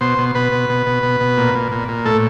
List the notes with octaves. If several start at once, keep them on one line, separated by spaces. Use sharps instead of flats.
B2 C5
B2
B2 B4
B2
B2
B2
B2
B2
A#2
A#2
A#2
A#2
A2 A4